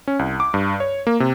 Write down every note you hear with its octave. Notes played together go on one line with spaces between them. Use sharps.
C#4
C2
D6
G2
C#5
A#3
C3